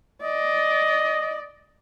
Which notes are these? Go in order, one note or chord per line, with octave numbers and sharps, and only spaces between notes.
D5 D#5